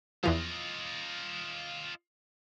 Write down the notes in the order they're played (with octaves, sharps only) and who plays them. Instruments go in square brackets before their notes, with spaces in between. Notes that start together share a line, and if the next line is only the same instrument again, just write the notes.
[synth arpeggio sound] E2 E3 F3 [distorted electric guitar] F4 D#5